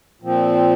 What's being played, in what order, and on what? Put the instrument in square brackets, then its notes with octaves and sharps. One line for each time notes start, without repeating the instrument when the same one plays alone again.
[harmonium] A#2 F3 C4